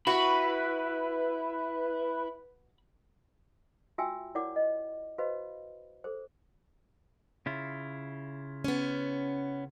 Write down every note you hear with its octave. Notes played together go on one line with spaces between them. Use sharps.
E4 F#4 B4 B5
F4 F#4 E5 G5 G#5 E6
E4 A#4 C#5 D5 F#5 D6
D#5
F#4 B4 C5 D#5 F5 B5
G#4 A4 C5
C#3 E4 F4
B3 C#4